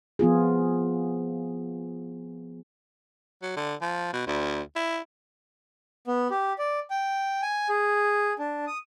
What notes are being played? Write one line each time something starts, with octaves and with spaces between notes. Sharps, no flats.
F3 B3 F4 G#4
F#3
D3
F3
B2
D2
E4
B3
G4
D5
G5
G#5
G#4
D4
D#6